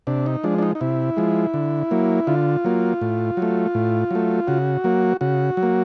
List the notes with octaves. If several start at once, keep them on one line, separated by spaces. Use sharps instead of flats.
C3 D4
D#4
F3 G#3 D4
D4
D#4
D#4
C3 E4
F3 G#3
D3
F#3 A#3
D3 F4
F#3 A#3
A2
F#3
A3
A2
F#3 A3
C#3 F#4
F#3 A#3
C#3 F#4
F#3
A#3